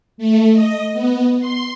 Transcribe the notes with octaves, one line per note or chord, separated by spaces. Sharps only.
A3
D#5
B3
C6